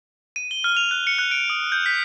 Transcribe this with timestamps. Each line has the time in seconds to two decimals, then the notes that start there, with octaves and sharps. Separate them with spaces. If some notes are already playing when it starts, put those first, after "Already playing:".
0.36 D#7
0.51 G7
0.64 F6
0.77 F7
0.91 F#6
1.07 C#7
1.19 F#6
1.31 D7
1.50 D#6
1.72 G6
1.86 B6